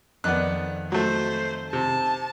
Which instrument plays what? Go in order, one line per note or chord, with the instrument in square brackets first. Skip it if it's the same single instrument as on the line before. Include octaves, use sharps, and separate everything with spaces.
[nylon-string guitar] F2 D#3 D#4 [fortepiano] B3 D5 F#6
[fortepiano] F#3 A3 [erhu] C5
[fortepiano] C3 [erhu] A5